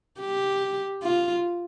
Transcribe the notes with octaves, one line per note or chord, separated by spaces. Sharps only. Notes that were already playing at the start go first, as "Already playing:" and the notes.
G4
F4